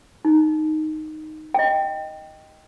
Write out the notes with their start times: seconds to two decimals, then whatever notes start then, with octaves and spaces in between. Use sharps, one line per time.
0.25 D#4
1.54 D#5 G5